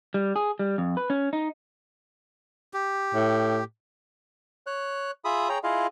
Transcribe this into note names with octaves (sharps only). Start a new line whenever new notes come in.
G3
G#4
G3
F2
B4
C#4
D#4
G4
A2
C#5 F#6
F4 G#4 E5 B5 D#6
G#4 C#5 G5 A#5
E4 F4 G#4 D#5 F5